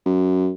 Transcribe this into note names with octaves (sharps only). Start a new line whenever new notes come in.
F#2